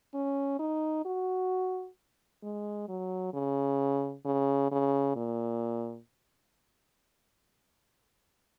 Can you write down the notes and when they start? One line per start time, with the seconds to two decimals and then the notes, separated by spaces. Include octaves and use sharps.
0.14 C#4
0.59 D#4
1.05 F#4
2.43 G#3
2.88 F#3
3.33 C#3
4.25 C#3
4.71 C#3
5.16 A#2